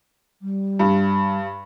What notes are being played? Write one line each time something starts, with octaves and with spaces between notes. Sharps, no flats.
G3
G2